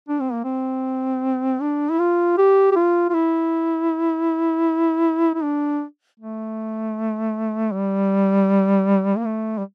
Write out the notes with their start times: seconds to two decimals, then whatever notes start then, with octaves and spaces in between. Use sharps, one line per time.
0.09 D4
0.20 C4
0.32 A#3
0.44 C4
1.61 D4
1.91 E4
1.99 F4
2.38 G4
2.72 G4
2.76 F4
3.10 F4
3.14 E4
5.34 E4
5.43 D4
6.20 A3
7.72 G3
9.17 A#3
9.25 A3
9.58 G3